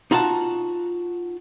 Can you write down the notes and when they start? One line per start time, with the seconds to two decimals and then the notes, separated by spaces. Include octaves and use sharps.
0.11 D#4 F4 F#4 F#5 A5